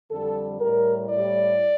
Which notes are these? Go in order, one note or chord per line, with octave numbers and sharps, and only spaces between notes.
F2 D3 G3 A4
A2 G3 A#4
A2 G3 D5